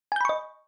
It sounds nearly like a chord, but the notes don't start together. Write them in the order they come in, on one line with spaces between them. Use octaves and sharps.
G#5 G6 B5 C#6 D#5